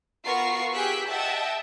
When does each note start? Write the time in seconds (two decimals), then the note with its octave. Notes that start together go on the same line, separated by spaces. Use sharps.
0.24 B3 F4 F#4 A#4 C#6 C7
0.74 G4 G#4 G5 E6 F#6 B6
1.10 D#5 E5 F#5 G5 A5 E6